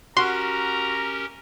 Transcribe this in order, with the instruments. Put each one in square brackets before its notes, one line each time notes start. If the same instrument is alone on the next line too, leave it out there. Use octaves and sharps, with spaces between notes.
[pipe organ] C#4 G4 A#4 [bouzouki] F#4 [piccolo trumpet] A#5 [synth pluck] C6